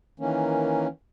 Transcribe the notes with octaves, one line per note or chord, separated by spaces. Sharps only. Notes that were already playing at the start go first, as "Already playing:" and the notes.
D#3 E3 A#3 C#4